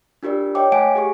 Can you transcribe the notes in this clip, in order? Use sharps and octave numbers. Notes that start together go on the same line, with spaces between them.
D4 F4 G4 A#4 D5
C#5 D#5 G5 D6
A3 F5 F#5 G#5 D7
G4 G#4 C#6